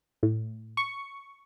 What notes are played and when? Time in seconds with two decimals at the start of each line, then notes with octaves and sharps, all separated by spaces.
0.23 A2
0.77 C#6